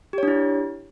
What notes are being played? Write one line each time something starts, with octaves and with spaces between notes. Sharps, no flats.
D4 E4 G4 C#5